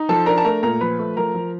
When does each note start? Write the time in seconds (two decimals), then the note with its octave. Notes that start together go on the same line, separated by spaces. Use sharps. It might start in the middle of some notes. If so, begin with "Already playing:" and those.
Already playing: D#4
0.09 F3 A4 A5
0.26 D4 A#4 A#5
0.38 A5
0.45 A3 A#4 A#5
0.63 A#2 A#4 A#5
0.81 F3 B4 B5
0.99 A3
1.17 F3 A#4 A#5
1.34 F3